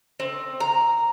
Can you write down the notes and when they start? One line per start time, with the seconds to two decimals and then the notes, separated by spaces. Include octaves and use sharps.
0.20 C4
0.60 A#5